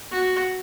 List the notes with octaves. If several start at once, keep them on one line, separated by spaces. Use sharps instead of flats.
F#4